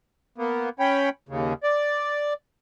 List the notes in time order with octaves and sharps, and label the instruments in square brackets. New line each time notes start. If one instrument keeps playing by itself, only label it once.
[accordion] A#3 B3
C#4 C#5 G5 B5
D#2 C#3
D5